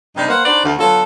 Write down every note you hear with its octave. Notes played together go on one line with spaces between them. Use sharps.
G2 C3 G3 D#4
A#3 B3 B4 C5 F5 F#5
D4 D#4 F#4 B4 C5 D5
D2
D3 F#3 B3 F4 F#4 A4